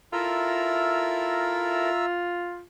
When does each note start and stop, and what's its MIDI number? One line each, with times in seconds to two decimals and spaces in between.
0.13 1.89 64
0.13 2.62 65
0.13 1.89 69
0.13 1.89 70
0.13 2.06 76
0.13 2.06 82
0.13 2.06 88